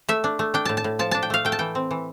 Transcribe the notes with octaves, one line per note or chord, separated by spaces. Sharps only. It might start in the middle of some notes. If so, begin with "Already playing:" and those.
A3 E5
D4
A3
D4 G5
A2 A5
A5
A2
F3 A5
D4 A5
G5
A3 F5
A3 G5
A5
E3 G5
C4
E3